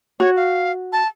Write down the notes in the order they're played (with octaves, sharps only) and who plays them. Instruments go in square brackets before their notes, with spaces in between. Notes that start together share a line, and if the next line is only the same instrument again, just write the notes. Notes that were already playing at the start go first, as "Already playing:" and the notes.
[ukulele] F#4 [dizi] C#5
[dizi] F5
A5